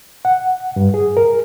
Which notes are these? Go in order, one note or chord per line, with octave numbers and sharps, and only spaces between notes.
F#5
G2
G#4
A#4